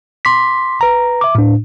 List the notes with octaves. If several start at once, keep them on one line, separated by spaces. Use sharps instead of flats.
C6 D6 B6
B4 A#5
E5 D6
A2 D4